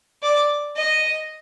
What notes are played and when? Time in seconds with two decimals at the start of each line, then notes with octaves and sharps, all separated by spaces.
0.23 D5
0.76 D#5